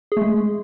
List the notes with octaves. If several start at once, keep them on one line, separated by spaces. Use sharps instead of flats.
G#4
A3
G#3